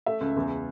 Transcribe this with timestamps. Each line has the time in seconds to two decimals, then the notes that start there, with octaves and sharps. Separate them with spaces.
0.06 A3 E5
0.21 C#2
0.36 E2